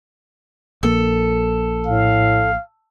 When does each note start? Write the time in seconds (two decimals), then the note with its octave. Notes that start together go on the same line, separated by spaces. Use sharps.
0.83 A#1 A#3 A4
1.86 A2 F5